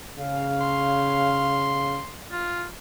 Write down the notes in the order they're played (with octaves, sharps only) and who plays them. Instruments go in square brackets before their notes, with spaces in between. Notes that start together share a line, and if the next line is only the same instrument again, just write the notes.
[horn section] C#3 F5
[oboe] C6
F4